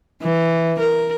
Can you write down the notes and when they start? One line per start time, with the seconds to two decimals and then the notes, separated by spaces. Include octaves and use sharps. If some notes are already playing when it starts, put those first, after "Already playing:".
0.22 E3
0.80 A#4